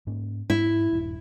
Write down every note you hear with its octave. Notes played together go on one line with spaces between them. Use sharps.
G#2 A#3 C#4
G#2 E4
D#1 G2